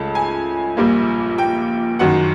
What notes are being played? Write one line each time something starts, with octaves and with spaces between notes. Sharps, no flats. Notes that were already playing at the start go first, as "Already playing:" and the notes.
Already playing: C#2 C#3 A3 A5
G#5
A#1 A#2 G3 A#3
G5
F#1 F#2 D#3 F#3 F#5